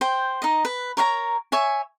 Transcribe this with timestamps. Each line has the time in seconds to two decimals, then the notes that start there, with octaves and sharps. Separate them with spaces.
0.01 C5 G5
0.42 D#4 D#5
0.65 B4
0.97 A#4 C#5 F5 A#5
1.52 C#5 E5 G#5